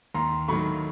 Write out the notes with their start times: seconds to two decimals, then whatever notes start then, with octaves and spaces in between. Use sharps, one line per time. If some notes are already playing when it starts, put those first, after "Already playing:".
0.14 D#2 A#5 C6
0.48 D#3 F#3 A3 B5 C#6